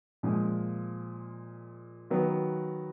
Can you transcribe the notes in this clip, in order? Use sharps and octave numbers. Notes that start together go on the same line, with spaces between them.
A#2 F3 G#3
D#3 F#3 B3